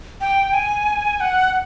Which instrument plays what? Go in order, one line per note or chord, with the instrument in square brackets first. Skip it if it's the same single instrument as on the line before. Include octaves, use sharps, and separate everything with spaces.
[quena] G5
G#5
F#5